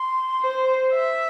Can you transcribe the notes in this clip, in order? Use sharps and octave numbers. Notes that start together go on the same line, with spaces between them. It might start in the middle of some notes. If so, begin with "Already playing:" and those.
Already playing: C6
C5
E5